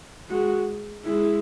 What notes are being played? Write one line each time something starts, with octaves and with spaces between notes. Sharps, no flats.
G#3 F#4
G#3 E4